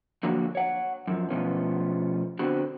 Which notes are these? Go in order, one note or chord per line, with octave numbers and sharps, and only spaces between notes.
D3 F3 F#3 A#3 F#4
C#5 F#5
F#2 F3
B2 F3 A3 B3 C#4
D3 B3 C4 F#4